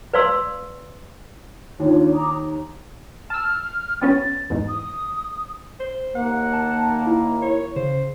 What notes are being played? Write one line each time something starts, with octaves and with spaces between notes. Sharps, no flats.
B4 D5 F5 C6 E6
D#2 D4 F4 C#5
A#5 D6 D#6
A#5
A5 E6 F6
G3 B3 C#4 A6
E2 G#2
D#6
C5
D#2 A#3 F#5
A5
E4
C#5
C#3 C5